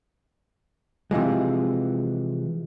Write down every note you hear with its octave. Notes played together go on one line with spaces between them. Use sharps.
C3 E3 F3 G#3